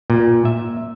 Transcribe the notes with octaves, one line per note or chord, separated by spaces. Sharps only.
A#2
E5